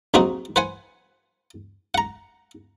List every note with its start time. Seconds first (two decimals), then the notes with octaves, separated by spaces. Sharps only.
0.14 A#1 F#3 C4 D#4 F#4
0.56 B4 C5 F#5 G#5
1.94 F#5 A#5